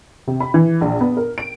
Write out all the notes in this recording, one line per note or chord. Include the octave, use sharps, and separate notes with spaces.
C3
B5
E3
A#1
B3
A#4
D7